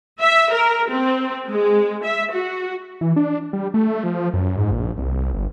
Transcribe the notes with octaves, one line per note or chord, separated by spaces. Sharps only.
E5
A#4
C4
G#3
E5
F#4
E3
D4
G3
A3
F3
F#2
G#2
A#1
C2
G1